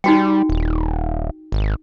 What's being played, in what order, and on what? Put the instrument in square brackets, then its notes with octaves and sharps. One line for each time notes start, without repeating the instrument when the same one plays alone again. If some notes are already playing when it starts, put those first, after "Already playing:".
[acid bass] G3 [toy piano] D#4 F#4 G5
[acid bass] D#1
G#1